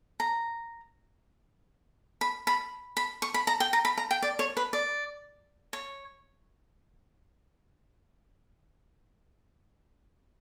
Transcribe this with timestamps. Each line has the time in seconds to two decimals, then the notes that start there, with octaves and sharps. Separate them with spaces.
0.20 A#5
2.21 B5
2.47 B5
2.97 B5
3.22 C#6
3.34 B5
3.47 A#5
3.60 G5
3.73 A#5
3.85 B5
3.98 A#5
4.11 G5
4.22 D5
4.39 C#5
4.57 B4
4.73 D5
5.73 C#5